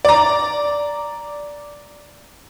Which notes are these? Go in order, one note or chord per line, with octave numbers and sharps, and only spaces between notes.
D5 A#5